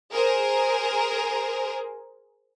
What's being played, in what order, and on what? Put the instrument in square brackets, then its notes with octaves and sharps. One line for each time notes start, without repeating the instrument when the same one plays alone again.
[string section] G#4 A#4 C5